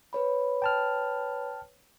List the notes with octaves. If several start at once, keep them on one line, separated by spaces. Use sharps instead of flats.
B4 C#5 B5
G5 A5 F6